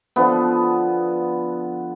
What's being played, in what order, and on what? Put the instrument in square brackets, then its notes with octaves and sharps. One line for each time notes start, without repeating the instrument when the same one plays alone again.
[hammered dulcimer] D3 F3 B3